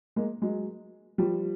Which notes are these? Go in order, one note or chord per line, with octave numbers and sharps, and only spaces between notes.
G#3 A#3
F#3 G#3
F3 G3